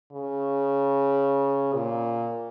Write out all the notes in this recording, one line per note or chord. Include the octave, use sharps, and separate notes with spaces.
C#3
A#2